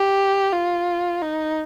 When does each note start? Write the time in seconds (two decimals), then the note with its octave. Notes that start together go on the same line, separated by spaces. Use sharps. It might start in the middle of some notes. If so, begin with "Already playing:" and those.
Already playing: G4
0.52 F4
1.22 D#4